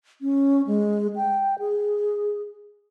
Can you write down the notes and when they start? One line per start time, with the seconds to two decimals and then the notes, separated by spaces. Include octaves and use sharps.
0.21 C#4
0.67 G#3
1.16 G5
1.59 G#4